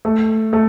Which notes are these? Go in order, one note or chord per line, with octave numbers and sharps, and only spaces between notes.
A3
A3